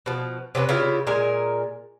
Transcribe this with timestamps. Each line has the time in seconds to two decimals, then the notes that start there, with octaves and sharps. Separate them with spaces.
0.06 B2 F3
0.55 C3 C#4 G4 B4
0.69 C#3 E4 F4 G4
1.07 A#2 G#3 A#4 G#5